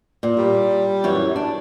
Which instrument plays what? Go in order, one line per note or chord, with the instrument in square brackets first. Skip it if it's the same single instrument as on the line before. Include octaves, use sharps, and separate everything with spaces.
[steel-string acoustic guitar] A#2
[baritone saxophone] G3
[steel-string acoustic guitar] F#2 E3 C#5
D4